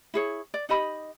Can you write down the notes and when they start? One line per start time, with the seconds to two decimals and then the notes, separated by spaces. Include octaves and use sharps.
0.14 E4 G#4 C#5
0.54 D5
0.69 D#4 G4 D#5 B5